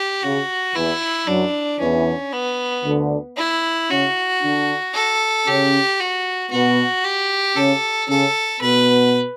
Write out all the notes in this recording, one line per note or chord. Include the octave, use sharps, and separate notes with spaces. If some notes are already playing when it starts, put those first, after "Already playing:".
Already playing: G4
C#3 F#4
E2 E3 E4
F#2 F#3 D4
E2 E3 C#4
B3
D2 D3
E4
C#3 C#4 F#4
D3 D4
A4
C#3 C#4 G4
F#4
B2 B3 F#4
G4
C#3 C#4 A4
C#3 C#4 A4
B2 B3 B4